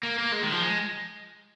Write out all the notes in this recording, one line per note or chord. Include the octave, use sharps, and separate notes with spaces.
A#3
A#3
G#3
D#3
F3
G#3